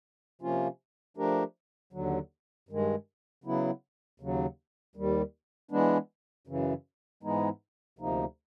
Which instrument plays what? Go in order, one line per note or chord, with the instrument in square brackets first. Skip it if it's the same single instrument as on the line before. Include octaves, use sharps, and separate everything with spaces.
[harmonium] C3 F3 A#3 C#4 F4
F3 A3 D4 G4 A#4
D#2 D3 F#3
G2 D#3 G#3
C#3 F#3 B3 E4
D#2 C#3 F#3
D#2 D#3 G3
E3 G#3 B3 D4
F#2 C#3 E3
G#2 E3 G#3 B3 D#4
D2 C3 F3 A#3 D#4